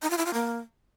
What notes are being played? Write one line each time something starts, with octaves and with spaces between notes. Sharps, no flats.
D#4
F4
E4
F4
A#3